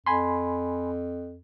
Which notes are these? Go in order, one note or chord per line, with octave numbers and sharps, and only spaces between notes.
F2 G#5 B5 C6